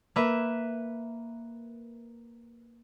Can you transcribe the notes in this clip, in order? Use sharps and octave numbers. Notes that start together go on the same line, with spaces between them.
A#3 B4 E5